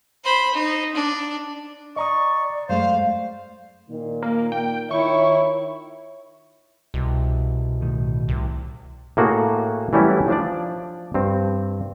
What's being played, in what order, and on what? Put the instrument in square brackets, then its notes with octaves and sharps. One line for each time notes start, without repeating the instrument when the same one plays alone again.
[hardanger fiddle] C5 B5
D#4
D4
[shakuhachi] D5 [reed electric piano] D#5 A#5 D#6 [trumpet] C#6
[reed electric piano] F#2 G#3 A3 [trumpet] C5 [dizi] F5
[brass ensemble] A#2 D#3
[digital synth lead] A#3
G5
[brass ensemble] D#3 F4 C#5 [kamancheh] E4 [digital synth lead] C#6
[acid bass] C2 [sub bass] B2
[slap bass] A2 D#3
[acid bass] C2
[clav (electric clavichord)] A2 A#3 F#4 G#4 A4 A#5
E3 F#3 G3 A3 C#4 E4
F3 D4 D5
G2 C4